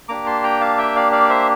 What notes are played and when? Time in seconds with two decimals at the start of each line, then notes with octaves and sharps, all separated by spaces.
0.09 A#3 D4 G4 A#5 D6
0.26 A5 C6
0.43 G5 A#5
0.61 F5 A5
0.78 E5 G5
0.95 D5 F5
1.12 D5 F5
1.30 C5 E5